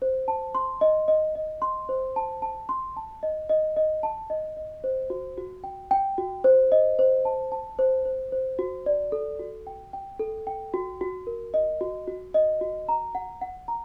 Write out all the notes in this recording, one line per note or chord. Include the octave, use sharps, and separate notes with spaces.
C5
A5
C6
D#5
D#5
D#5
C6
C5
A5
A5
C6
A5
D#5
D#5
D#5
A5
D#5
D#5
C5
F#4
F#4
G5
G5
F#4
C5
D#5
C5
A5
A5
C5
C5
C5
F#4
D5
A4
F#4
G5
G5
A4
G5
F#4
F#4
A#4
D#5
F#4
F#4
D#5
F#4
A#5
F#5
F#5
A#5